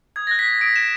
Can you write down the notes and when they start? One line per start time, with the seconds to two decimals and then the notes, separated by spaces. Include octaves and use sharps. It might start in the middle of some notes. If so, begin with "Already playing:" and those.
0.16 D#6 G#6
0.27 A#6
0.31 F#6
0.39 B6
0.46 F#6
0.61 D#6 D7
0.76 F#6 E7